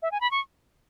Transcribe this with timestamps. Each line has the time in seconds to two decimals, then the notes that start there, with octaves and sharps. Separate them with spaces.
0.02 E5
0.12 G#5
0.21 B5
0.31 C#6